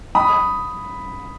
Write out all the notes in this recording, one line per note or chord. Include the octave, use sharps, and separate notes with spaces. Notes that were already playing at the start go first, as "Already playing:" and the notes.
B5 D#6